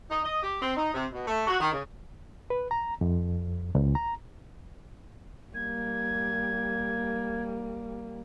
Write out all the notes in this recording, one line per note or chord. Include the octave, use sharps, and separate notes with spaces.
D#4
D#5
G4
C4
D#4
C3
B2
A3
F#4
D#3
C#3
B4
A#5
F2
C#2
A#5
G3 A#3 G#6